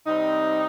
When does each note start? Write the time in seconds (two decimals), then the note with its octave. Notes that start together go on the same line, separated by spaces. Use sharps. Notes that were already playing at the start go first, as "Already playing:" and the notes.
0.05 C3 G3 C4 D#4